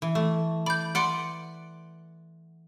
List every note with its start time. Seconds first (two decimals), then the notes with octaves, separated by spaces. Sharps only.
0.02 E3
0.15 A3
0.66 D5 B5 G6
0.95 B4 D5 F#5 C6 C#7 D7